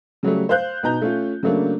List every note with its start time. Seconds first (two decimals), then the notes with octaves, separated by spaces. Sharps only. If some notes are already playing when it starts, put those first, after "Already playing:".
0.23 C#3 F#3 G3 A3
0.49 C5 F5 F#6 G6
0.83 B2 D#4 A#5 G6
1.02 A3 C#4 F4
1.43 C#3 F#3 A3 A#3 D4